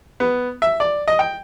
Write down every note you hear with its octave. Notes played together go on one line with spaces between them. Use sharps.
B3
E5
D5
D#5
G5